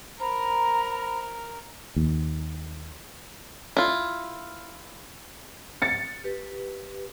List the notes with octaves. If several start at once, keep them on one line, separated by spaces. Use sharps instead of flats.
A#4 C5 A#5 B5
D#2
E4 F4
A6 C#7
G4 B4